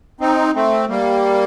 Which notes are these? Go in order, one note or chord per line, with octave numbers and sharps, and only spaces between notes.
C4 D#4
A3 C4
G3 A#3